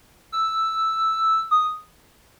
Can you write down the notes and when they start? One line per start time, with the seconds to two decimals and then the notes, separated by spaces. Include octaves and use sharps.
0.32 E6
1.51 D#6